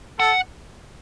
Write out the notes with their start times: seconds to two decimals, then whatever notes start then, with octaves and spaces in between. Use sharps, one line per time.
0.20 A4 F#5